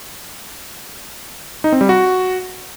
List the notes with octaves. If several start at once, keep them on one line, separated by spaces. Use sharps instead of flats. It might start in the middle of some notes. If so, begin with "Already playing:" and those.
D#4
C4
G3
F#4